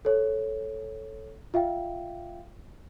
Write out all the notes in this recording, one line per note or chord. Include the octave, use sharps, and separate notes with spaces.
A4 C#5
F4 E5 F5 G5